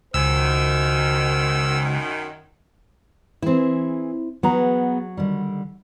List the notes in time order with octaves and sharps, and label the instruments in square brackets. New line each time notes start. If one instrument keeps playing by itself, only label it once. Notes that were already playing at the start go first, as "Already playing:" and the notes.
[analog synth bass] C#2 [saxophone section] F#2 D#3 [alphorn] C5 [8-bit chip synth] E6
[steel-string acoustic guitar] E3 G#4 [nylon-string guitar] C4 E4
[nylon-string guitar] F#3 [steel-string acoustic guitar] B3 G#4 A#5
[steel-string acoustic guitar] D3 D#3 G3